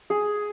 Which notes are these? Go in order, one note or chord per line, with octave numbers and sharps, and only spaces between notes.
G#4